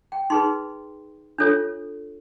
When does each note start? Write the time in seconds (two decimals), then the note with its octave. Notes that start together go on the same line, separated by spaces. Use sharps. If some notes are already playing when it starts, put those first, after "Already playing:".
0.12 G5
0.30 D#4 G#4 B4 C6
1.38 D4 F4 A4 C#5